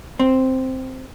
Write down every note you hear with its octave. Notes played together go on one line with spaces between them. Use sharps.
C4